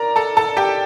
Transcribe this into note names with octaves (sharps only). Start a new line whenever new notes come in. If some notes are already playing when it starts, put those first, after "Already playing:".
Already playing: A#4 D5 A#5
A4 A5
A4 A5
G4 G5